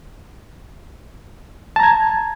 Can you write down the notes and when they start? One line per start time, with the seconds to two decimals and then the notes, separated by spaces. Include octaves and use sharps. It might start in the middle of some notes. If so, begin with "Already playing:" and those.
1.76 A5
1.80 A#5
1.83 G#6